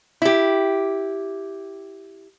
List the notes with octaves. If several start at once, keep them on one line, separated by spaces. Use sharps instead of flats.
E4 G4